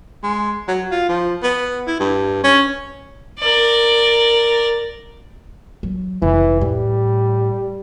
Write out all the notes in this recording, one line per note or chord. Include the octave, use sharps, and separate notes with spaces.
G#3
F#3
F4
F3
B3
E4
G2
C#4
A#4 D5
F#3
F1 E3
A2 G3